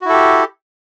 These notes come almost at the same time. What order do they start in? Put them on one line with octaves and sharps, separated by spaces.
F#4 E4 A4 G4